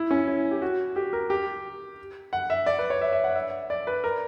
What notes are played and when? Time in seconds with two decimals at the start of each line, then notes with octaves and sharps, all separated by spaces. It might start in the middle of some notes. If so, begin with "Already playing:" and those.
Already playing: E4
0.11 C#4
0.28 E4
0.51 G4
0.62 F#4
0.96 G4
1.13 A#4
1.30 G4
2.33 F#5
2.50 E5
2.66 D5
2.79 B4
2.90 C#5
3.01 E5
3.13 E5
3.24 F#5
3.36 E5
3.70 D5
3.87 B4
4.04 A#4